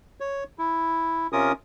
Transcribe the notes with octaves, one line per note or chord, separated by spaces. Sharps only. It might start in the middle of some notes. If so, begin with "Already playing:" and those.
C#5
E4
C3 C#4 F4 A#4 D#6